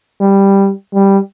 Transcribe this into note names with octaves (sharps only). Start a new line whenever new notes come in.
G3
G3